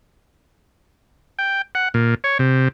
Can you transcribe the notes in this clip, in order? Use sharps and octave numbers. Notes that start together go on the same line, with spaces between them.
G5
F#5
A#2
C#5
C3